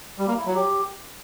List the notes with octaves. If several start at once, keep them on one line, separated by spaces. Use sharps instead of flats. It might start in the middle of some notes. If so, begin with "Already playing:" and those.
G3
A#3
E4
F#3
G4